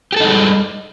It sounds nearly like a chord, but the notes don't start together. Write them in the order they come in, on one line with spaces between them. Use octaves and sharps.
G4 A4 D#4 G#3 G3